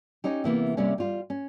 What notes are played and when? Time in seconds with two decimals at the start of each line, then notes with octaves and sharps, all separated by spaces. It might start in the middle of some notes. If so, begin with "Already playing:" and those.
0.24 C#4 D#4 G4
0.44 C3 E3 A#3 B3
0.77 C3 G3 A#3 C#4
0.98 G3 F4
1.30 C#4